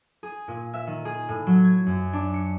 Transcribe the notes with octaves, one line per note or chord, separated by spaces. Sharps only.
G#4
A#2
E5
D#3
G#4
A2
F#3
G#6
F#2
D4
C#7